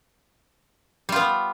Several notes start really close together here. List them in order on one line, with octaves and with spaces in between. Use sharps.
G3 F4 B3